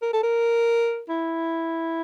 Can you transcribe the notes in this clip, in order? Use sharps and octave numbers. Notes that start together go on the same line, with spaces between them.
A#4
A4
A#4
E4